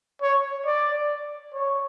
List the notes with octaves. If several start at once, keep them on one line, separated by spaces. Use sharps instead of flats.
C#5
D5
C#5